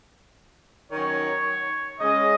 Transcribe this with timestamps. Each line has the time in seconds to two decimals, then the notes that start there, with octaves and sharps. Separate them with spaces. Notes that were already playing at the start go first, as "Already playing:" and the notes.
0.91 D#3 F#3 C#4 C#5
1.99 C#3 G#3 C#4 D#5